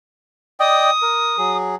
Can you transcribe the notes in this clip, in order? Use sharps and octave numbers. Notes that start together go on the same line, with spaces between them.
D5 D#5 G5 D#6
A#4
F#3 G#4